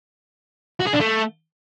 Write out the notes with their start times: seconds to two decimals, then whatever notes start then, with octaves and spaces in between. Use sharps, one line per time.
0.80 F#4
0.86 G#4
0.93 D4
1.00 A3